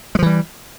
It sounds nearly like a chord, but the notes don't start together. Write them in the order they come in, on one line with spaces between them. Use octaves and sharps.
G#3 F3 E3 G3